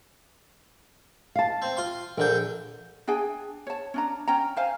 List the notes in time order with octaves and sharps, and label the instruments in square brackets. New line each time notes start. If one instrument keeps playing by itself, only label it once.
[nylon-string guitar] F5 A5
[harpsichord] C4
F4 C6
[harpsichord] A#1 D3 G5 [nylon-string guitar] A#4
[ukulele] D4 G#4 G5 G#5
C#5 A5
C#4 D4 A#5
C#4 G5 A#5
C5 F5 G#5